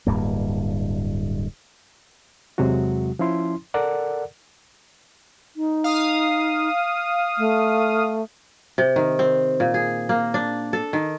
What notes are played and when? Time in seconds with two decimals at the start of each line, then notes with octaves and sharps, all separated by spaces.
0.07 D1 G2 A#3
2.58 E2 C3 F#3 G#3 F#4
3.19 F3 C#4 E4 C6
3.74 A4 A#4 D5 F#5
5.56 D#4
5.84 F5 D#6
7.38 A3
8.78 C3
8.96 D#3
9.19 C4
9.60 A#2
9.74 G#4
10.09 A#3
10.34 D4
10.73 A4
10.93 D#3